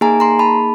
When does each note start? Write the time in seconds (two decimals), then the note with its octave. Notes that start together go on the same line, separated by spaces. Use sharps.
0.01 A#3 D#4 G#4 G#5 A#5
0.20 A#5 C6
0.39 A5 B5